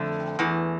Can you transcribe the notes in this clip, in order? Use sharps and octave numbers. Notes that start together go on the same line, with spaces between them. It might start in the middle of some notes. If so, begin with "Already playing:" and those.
Already playing: F2 D3 A3
E2 E3